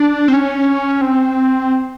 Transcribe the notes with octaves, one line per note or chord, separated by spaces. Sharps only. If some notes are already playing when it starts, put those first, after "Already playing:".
Already playing: D4
C4
C#4
C4